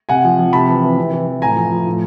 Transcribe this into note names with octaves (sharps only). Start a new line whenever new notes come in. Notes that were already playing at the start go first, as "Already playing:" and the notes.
C3 F#5 G#5
F3
F3
C3 A5 B5
E3
E3
C3
E3
E3
A2 G#5 A#5
F3
F3
A2